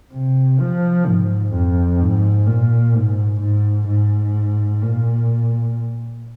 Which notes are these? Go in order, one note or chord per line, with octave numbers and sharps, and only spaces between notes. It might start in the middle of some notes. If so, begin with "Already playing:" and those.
C3
F3
G#2
F2
G#2
A#2
G#2
G#2
G#2
A#2